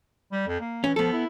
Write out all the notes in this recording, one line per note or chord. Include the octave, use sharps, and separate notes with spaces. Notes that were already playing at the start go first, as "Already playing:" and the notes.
G3
F2
A#3
E3 C#4
F3 B3 A4
E4